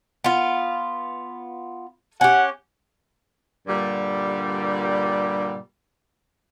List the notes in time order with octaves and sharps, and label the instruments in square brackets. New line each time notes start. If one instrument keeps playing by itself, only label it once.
[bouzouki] B3 F4
[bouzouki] C#4 G4 [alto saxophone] F#5
[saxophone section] G2 A#2 D3 G3